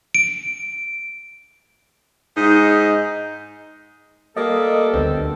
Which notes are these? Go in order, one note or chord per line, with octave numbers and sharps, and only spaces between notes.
D7
G#2 D#4
G3 A3 A#3 A4 D#5
D2 D3 B3 C4